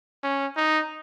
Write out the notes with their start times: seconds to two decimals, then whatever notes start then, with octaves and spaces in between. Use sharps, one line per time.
0.23 C#4
0.56 D#4